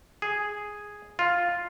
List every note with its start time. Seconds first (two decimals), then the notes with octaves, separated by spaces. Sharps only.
0.22 G#4
1.19 F4